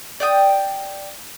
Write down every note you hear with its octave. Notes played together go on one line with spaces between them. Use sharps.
D5 G5 D#6